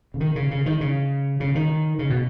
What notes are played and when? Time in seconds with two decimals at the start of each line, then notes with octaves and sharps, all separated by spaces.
0.14 C#3
0.20 D#3
0.36 C#3
0.51 C#3
0.66 D#3
0.81 C#3
1.40 C#3
1.55 D#3
1.99 C#3
2.10 B2